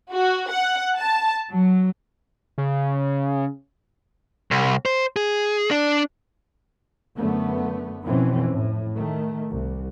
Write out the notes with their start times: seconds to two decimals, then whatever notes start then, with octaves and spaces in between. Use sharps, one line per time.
0.12 F#4
0.50 F#5
0.97 A5
1.50 F#3
2.58 C#3
4.51 C2
4.85 C5
5.16 G#4
5.71 D4
7.16 F#2 D3 A3 B3
8.03 F2 B2 E3 C4 C#4
8.49 A2
8.95 D#3 A3
9.49 C2